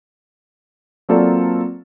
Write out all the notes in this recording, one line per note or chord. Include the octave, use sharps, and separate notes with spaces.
F#3 A#3 C4 F4 A4 D5